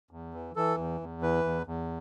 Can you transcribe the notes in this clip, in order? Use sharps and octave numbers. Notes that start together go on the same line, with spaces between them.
E2
E3
E3 A4
E2
E2
E3 B4
E2
E2